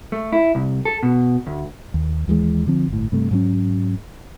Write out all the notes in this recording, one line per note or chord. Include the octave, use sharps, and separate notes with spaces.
A3
E4
C2
A4
B2
D2
D#2
D#2 E3 F3 G#3
D3 F3 C4
G1 A2
G2 C3 A3
G#2 F#3 C#4